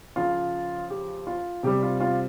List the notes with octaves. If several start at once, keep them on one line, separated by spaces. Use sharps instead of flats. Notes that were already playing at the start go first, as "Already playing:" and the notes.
C#3 F3 F4
G4
F4
C3 G3 G4
F4
F4